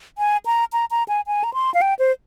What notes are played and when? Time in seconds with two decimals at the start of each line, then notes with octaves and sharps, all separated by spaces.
0.18 G#5
0.46 A#5
0.73 A#5
0.91 A#5
1.08 G#5
1.27 G#5
1.44 A#5
1.54 C6
1.74 F5
1.81 G5
1.99 C5